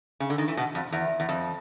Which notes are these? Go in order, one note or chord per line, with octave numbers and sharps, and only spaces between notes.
C#3
D3
D#3
E3
B2
F2
E2
E2
F2